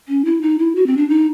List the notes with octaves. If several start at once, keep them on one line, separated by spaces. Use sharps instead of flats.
C#4
E4
D#4
E4
F#4
C4
D4
D#4